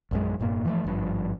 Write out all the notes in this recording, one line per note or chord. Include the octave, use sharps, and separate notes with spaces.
A#1 F#2 G#3
F1 G2 A#2 A#3
E3 F3 G#3 A3
G#1 G2 F3